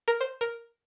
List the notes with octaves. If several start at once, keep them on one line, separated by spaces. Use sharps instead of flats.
A#4
C5
A#4